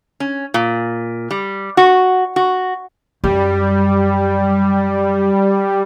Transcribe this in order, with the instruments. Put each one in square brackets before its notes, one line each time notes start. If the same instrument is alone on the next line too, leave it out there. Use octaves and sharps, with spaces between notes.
[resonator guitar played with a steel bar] C#4
A#2
G3
F#4
F#4
[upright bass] F#2 [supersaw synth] G3